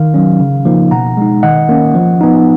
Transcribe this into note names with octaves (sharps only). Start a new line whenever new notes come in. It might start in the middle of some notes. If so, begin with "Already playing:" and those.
Already playing: D#3 F5
F#3 C#4
C#3
F3 A#3 D#4
B2 F#5 A#5
G#3 D#4
D#3 D#5 F#5
A#3 C#4
F3
B3 D#4